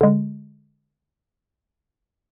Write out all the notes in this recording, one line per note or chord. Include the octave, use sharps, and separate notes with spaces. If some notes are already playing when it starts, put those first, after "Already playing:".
D3 G#3